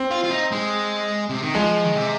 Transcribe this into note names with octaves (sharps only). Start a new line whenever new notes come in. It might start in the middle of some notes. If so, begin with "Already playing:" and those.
Already playing: C4
F4
F4
D#4
G#3
C3
D#3
F3 G#3
D#3
C3